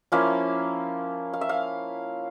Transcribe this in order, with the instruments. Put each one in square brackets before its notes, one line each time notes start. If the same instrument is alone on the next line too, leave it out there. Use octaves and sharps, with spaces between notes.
[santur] F3 A#3 C#4 E4 F5
F5
E5
F5